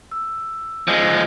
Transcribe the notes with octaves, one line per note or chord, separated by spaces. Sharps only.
E6
F3 G#3